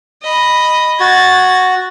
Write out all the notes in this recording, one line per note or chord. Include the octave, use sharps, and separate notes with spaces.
D#5 B5
F#4 G#6 A6